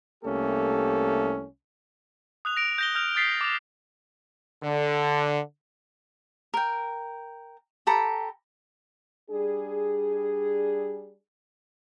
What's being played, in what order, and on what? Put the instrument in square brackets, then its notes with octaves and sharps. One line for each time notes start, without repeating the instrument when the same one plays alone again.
[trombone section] C2 A3 A#3 C#4 G4 A4
[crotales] D#6 F#6 F7
A#6 D7 F7
G6 A#6 G7
F6 G6 F7
D#6 A6 B6 C7
D6 F7
[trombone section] D3
[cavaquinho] A#4 G5
G4 A4 A#5 B5
[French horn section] G3 D4 G#4